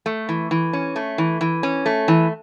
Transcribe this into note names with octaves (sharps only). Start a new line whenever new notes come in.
A3
E3
E3
C#4
A3
E3
E3
C#4
A3
E3